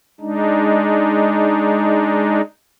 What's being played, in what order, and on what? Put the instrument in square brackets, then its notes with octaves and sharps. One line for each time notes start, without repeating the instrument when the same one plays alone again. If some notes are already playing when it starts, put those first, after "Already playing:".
[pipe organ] G#3 D4 D#4